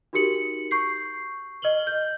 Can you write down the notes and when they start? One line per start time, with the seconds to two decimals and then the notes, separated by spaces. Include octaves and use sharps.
0.13 D#4 F#4 G4 A#4 C#7 F#7
0.71 C#6 G6 C7
1.62 D#5 F6 F#7 G7
1.87 G6